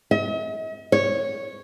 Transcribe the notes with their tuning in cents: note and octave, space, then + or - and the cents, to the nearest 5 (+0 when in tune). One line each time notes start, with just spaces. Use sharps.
D#5 +45
C#5 -10